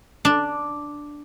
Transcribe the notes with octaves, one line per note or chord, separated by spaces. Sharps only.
D4